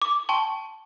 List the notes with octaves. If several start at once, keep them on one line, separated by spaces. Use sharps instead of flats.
D6
G5 A5 C6 C#6